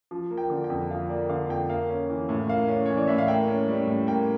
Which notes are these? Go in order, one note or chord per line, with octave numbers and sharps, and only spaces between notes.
F3
A#3
G5
D3
G5
F2
F3 F5
A#3 D5
D3 F5
F2 G5
A#3 F5
C#4
E3
A2
A#3 F5
C#4
E3 C#5
D5
A2 E5
F5
A#3 G5
C#4
G3
A2
A#3 G5